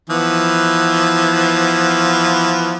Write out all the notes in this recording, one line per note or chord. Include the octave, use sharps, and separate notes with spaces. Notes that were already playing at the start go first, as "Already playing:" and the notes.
E3 F3 B3